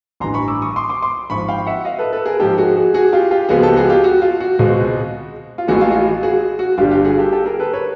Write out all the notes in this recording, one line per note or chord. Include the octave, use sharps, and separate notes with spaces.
A1 G2 E3 A#5 C6
B5 C#6
D6 E6
C#6 D#6
C6 D6
C6 D6
C6 D6
G#1 G#2 F3 B5 C#6
F5 G5
E5 F#5
D#5 F5
A4 B4
A4 B4
G#4 A#4
G#2 F3 G#3 G4 A4
F#4 G#4
F#4 G#4
F#4 G#4
F4 G4
F4 G4
C#2 C#3 F3 G#3 B3 F#4 G#4
G4 A4
F#4 G#4
F4 G4
F#4
F4
F#4
C#2 B2 G#3 C4
F4
A1 A2 E3 G#3 F#4
F4
F#4
F4
F#4 G#4
F#4
G1 G2 D3 G3 F4 G4
F4 G4
F#4 G#4
G4 A4
G4 A4
G#4 A#4
A4 B4
B4 C#5